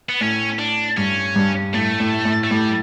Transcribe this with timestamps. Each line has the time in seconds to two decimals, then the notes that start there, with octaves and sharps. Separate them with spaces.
0.09 B3
0.21 A2 C#4
0.59 D4
0.97 G2 C#4
1.36 G2
1.74 A2 A3
2.00 A2
2.25 A2
2.44 A3
2.51 A2 G3